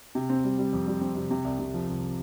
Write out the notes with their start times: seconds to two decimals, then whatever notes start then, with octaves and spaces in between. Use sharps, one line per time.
0.15 C3
0.29 C4
0.44 G3
0.58 G3
0.73 F2
0.87 G3
1.01 C4
1.16 C3
1.30 C3
1.44 C2
1.59 C3
1.74 F3
1.88 C2